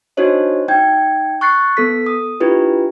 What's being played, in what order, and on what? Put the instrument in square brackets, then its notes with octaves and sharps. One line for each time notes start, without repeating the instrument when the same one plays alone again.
[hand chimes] D4 D#4 F#4 C5 C#5 D#5
D#4 G5 G6 G#6
C#6 F#6 A6 C7 C#7
B3 A4 B6
D#6
D4 E4 F4 G4 B4